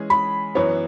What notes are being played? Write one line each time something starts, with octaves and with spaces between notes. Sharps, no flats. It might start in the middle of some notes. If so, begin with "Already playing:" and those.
Already playing: E3 G#3 C#4 G#4
B5
F#2 E3 B3 C#5